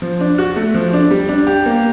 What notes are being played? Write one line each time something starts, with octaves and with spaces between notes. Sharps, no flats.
F3
D4
F#4
A3
F3
D4
G3
D4
G4
A#3